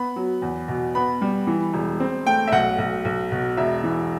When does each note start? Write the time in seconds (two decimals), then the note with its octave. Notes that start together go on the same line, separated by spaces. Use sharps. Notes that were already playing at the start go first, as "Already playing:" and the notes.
Already playing: B3 B5
0.16 F#3
0.42 E2
0.68 B2
0.95 B3 B5
1.21 G3
1.47 E3
1.74 E1
2.00 C4
2.26 A3 G5
2.47 E5
2.52 B1 F#5
2.78 B1
3.05 B1
3.31 B2
3.57 E1 E5
3.84 E3